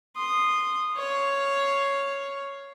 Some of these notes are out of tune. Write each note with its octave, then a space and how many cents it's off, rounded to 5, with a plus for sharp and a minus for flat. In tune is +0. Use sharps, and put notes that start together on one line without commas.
C6 +0 D#6 -15
C#5 +0 F5 +0